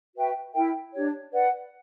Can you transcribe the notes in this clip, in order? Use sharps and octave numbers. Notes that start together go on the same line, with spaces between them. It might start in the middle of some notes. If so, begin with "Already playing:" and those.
F#4 B4 E5 G5
E4 A#4 E5 G5
D4 G4 C#5
B4 D5 F#5